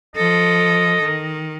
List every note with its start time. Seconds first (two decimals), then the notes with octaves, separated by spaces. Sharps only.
0.16 F3 A4 D#5
1.02 D#3